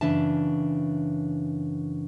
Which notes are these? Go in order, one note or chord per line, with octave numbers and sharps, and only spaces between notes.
F#2 C#3 E3 D4 E5 A5